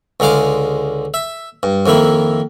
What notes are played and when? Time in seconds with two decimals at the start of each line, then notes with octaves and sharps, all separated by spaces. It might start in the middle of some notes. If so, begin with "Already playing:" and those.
0.20 C#2 D3 G#3 F5 D6
1.14 E5
1.63 G2
1.86 F2 D#3 A#3 E4